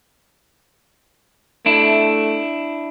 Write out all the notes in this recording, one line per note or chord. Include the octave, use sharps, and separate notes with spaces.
A3 D4 E4